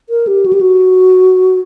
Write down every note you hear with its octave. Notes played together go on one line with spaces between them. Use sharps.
A#4
G4
F#4
G4
F#4